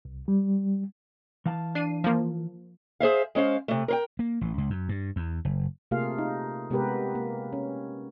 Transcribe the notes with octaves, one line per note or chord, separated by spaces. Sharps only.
C2
G3
E3 F5 A5
D4 C7 D#7
F3 A#3
G#4 C5 E5 F5
G#3 C#4 C5 F5
C3 A3
A#4 C5 G5
A#3
A1
C#2
F#2
G2
E2
F#1
C3 A3 A#3 F4 G#4 F5
D#4
C3 G#3 B3 G4 A#4 B4
A#3
C#4